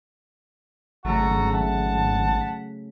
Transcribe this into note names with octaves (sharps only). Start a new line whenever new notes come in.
G#1 C#3 F#3 A3 F#4 A4 A#5
E5 F#5 A5
B6